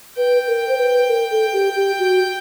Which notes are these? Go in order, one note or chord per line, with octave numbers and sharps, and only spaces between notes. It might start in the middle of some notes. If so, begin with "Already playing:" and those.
B4 G5
A#4
C5
B4
A#4
A4
G4
G4
F#4